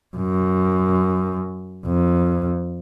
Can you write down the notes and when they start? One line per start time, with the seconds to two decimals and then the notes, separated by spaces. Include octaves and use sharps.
0.16 F#2
1.87 F2